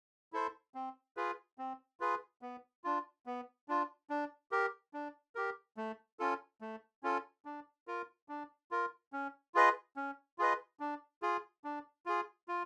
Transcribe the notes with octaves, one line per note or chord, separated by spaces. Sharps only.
E4 A4 C5
C4
F4 G#4 B4
C4
F4 G#4 B4
B3
D4 F4
B3
D4 F4
D4
G4 A#4
D4
G4 A#4
A3
C#4 F4 A4
A3
C#4 F4 A4
D4
F4 A#4
D4
F4 A#4
C#4
F4 G#4 B4 D#5
C#4
F4 G#4 B4 D#5
D4
F4 G#4
D4
F4 G#4
F4